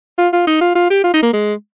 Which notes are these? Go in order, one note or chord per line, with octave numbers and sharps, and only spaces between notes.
F4
F4
D#4
F4
F4
G4
F4
D#4
A#3
G#3